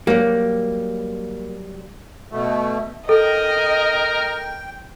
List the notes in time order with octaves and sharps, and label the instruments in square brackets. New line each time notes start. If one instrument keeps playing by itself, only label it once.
[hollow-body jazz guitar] F#3 G3 [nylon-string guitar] A#3
[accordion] B2 A3
[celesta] A4 [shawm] A#4 [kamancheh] D#5 [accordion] G5